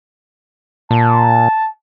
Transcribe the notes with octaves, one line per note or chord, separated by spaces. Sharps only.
A#2 A5